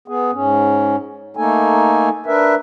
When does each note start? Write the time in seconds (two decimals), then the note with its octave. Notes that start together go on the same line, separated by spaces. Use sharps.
0.08 B3 G#4
0.33 G#2 C#4
1.37 A3 A#3 D#4 A4 G#5
2.26 D4 A#4 B4 E5